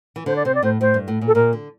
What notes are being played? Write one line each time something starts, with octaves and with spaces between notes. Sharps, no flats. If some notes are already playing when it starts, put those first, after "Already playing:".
E3
D3 C5
D5
C3 C5
D5
A2 C5
A2 C5
G2
A2
A#2
A4
A#2 A#4
D3